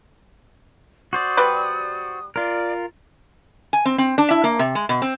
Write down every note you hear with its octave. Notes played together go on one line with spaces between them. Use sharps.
F#4 C5 D5 D#6
G3 G4 B4
F4 A#4 D5
G#5
C4
C4
D4
E4
A#3
C3
G#3
B2
C4